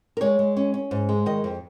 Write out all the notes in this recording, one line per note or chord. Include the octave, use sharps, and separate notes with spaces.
A#4
G#3 C#5
G#3
C#4
C#4
G#2
G#3
D#3 D#5
F2